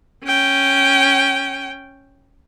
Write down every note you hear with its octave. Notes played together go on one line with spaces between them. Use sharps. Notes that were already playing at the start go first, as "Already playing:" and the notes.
C#4 G5